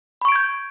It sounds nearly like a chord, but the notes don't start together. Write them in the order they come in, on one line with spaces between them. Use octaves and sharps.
B5 C#6 D7 G#6 G6